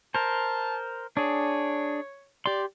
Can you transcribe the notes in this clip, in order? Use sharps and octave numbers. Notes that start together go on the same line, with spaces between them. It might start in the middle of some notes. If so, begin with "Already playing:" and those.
A#4 C5 A5
D4 G#4 C#5
G4 D5 C6